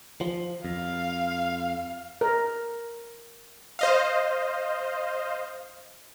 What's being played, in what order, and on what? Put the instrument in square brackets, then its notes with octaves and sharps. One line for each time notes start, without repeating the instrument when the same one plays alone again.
[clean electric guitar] F3
[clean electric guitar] F2 [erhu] F5
[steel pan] A#4
[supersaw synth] C5 D#5 F5